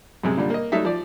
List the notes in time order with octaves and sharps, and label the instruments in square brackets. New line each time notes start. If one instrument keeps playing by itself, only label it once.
[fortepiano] F#2 C3 G#3
A#2 D3 G3
A#3 D#5
F#3 G3 A3 D#4 E5
F3 D5